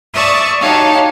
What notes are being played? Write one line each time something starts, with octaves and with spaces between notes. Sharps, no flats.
D5 E5 A5 C#6 D#6
D#4 F#4 G4 C#5 F5 A5